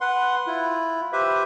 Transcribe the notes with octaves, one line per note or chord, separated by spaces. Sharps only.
B4 F#5 C6
E4 F4
G4 B4 C5 E5